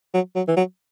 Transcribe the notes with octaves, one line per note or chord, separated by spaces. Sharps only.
F#3
F#3
E3
F#3